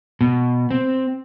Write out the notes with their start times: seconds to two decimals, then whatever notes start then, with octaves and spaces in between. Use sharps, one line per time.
0.21 B2
0.71 C4